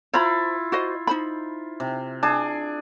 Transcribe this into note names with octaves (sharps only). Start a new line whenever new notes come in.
E4 F4 C5 A#5 B5
F#4 C5 D#5
D#4 C5 B5
C3
D4 G#4 A5